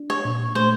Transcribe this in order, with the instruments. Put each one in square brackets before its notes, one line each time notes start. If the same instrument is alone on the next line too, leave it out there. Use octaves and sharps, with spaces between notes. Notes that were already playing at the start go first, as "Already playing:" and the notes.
Already playing: [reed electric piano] D4
[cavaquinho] C#5
[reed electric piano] A#2
[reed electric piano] A3 [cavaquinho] C5